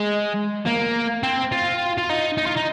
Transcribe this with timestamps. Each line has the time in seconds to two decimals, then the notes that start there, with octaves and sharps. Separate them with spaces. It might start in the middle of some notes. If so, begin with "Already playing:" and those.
Already playing: G#3
0.66 A#3
1.23 C4
1.52 F4
1.98 F4
2.09 D#4
2.37 D#4
2.46 F4
2.57 D#4